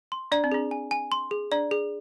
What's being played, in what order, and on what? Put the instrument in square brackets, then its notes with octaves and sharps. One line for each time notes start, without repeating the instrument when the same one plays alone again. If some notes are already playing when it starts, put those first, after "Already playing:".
[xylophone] C6
[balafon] D4 [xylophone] D5
[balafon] C4
[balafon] D4 [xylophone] G#4
[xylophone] G#5
G#5
C6
G#4
[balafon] D4 [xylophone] D5
[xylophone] G#4